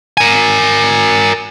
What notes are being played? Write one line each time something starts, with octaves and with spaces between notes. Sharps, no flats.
A#4 G#5